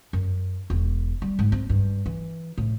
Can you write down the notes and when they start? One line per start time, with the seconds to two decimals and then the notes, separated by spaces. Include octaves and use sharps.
0.13 F#2
0.70 E1
1.22 G3
1.39 G#2
1.52 C4
1.69 G2
2.06 E3
2.58 A2